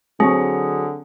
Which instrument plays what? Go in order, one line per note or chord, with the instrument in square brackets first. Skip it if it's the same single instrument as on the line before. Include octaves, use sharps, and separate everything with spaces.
[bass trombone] D3 [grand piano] F#3 C5 C#6 [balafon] C4 [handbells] G#4